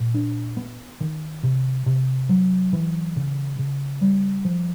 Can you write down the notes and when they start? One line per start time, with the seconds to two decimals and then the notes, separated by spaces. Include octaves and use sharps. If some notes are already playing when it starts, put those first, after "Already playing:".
Already playing: A#2
0.14 D4
0.57 B3
1.00 D#3
1.43 C3
1.86 C3
2.29 F#3
2.73 E3
3.16 C#3
3.59 C#3
4.01 G3
4.45 F3